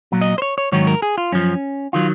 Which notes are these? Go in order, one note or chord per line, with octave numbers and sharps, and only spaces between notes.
A#2 F#3
D#5
C5
C#5
C#5
G#2 D#3 F#3 C#5
A#4
G#4
F4
F#2 F3 C#4
D#3 F#3 F4